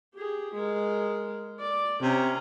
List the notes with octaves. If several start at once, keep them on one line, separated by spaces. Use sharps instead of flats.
G4 G#4
G#3 A#4
D5 D6
C3 C#4 A#5